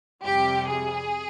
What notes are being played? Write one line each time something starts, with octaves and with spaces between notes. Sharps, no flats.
F2 C3 G3 G4
G#4